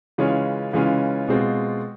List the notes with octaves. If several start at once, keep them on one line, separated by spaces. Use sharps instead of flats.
C#3 E3 G#3 C#4 F4
C#3 E3 G#3 C#4 F4
B2 G#3 C4 F4